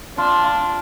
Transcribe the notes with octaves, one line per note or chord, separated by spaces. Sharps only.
D4 F4
F4